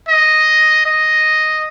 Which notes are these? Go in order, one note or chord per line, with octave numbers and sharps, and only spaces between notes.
D#5
D#5